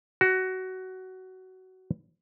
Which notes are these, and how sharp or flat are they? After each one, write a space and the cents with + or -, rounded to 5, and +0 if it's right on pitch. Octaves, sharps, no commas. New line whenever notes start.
F#4 +15